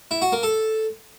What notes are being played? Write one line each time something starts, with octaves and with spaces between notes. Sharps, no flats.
E4
F#4
A#3
A4